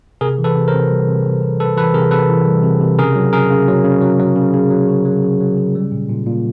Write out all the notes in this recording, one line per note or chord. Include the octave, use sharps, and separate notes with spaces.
C3 G#4 A#4
E3
A4 B4
C3
A#4 C5
C3
G3
C3
C3
C3
C3 A4 B4
E3 A4 B4
C3 G#4 A#4
C3 A4 B4
E3
G3
C3
C3
C#3 G#4 A#4
F#3
C#3 G#4 A#4
C#3
F#3
C#3
F#3
F#3
C#3
C#3
F#3
C#3
F#3
C#3
F#3
C#3
G3
A#2
A#2
A#2